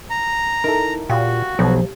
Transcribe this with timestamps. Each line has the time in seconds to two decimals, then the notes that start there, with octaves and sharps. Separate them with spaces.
0.10 A#5
0.64 D#4 E4 A4 A#4
1.10 A#2 F#4 G4 F5
1.59 B1 F3